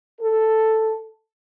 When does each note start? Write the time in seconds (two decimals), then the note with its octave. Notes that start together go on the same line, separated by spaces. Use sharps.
0.21 A4